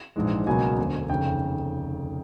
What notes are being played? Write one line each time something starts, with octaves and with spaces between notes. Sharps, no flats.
A#1 G#2 E3 G#3
C#2 B2 F#3 A#3 G#5
E1 D2 D3
F1 D#2 C#3 G5